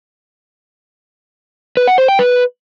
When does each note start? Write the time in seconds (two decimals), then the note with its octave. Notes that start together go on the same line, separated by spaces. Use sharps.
1.77 B4
1.88 F#5
1.98 C5
2.08 G5
2.19 B4